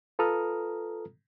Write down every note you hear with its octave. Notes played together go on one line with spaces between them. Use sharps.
F4 A4 B4 A#5 D#6 F6